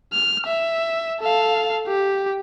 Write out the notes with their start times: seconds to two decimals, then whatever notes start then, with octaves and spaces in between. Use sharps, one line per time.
0.13 F6
0.47 E5
1.20 A4 F5
1.87 G4